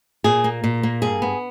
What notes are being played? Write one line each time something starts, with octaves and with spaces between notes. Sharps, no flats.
A#2 G#4
A#3
A#2
A#3
G2 G#4
B3